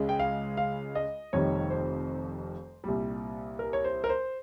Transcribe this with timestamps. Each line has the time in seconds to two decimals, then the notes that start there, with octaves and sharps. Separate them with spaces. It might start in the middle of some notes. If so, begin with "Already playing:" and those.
Already playing: C#2 C#3 G#3
0.09 G5
0.19 F5
0.57 F5
0.95 D#5
1.33 F1 F2 D#3 G3 C#5
1.70 C5
2.84 C2 A#2 G3
3.59 A#4
3.73 C#5
3.84 C5
4.04 A#4
4.09 C5